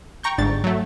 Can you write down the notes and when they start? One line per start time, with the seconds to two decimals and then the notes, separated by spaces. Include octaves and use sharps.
0.23 G5 A#5 C#6 G6
0.38 G1 G#2 D4 A6
0.64 F#3 A3